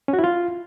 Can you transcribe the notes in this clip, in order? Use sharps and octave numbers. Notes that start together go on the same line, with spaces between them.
C#4
F#4
E4
F4